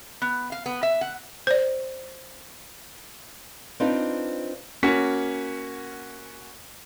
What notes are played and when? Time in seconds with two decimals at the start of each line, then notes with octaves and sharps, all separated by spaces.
0.22 B3
0.52 F5
0.66 B3
0.83 E5
1.01 F#5
1.47 C5 D5
3.80 C4 D4 D#4 F4 B4
4.83 A#3 C#4 F#4 F#5 B6